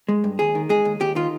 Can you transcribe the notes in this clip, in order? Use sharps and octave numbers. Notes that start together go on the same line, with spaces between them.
G#3
G2
D#2 G#4
D#3
G#3 G#4
D#2
D#2 G4
D#3 F4